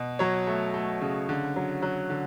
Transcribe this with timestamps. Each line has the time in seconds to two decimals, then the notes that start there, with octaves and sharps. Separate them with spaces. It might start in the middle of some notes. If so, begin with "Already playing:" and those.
Already playing: B2
0.19 F#3 C#5
0.47 A3
0.74 A3
1.01 C#3
1.29 D3
1.56 F#3
1.82 F#3
2.10 D3